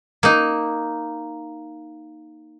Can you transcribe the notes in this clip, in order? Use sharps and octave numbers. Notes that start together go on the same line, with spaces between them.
A#3 D#4